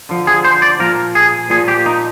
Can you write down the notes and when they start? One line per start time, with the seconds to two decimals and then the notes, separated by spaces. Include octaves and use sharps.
0.09 D3 F3
0.27 G#4
0.44 C5
0.62 D5
0.80 A#2 F3 A#4
1.15 G#4
1.50 A#2 F3 G#4
1.68 G4
1.86 D#4